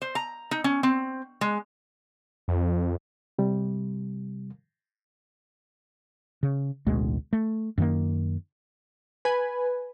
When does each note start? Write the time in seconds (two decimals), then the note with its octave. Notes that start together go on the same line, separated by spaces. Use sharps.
0.02 C5
0.15 A#5
0.51 D#4
0.64 C#4
0.83 C4
1.41 G#3
2.48 F2
3.39 C3 G3
6.43 C#3
6.87 A1 D2 B2 G#3
7.33 A3
7.78 F#2 D#3 A#3
9.25 B4 G#5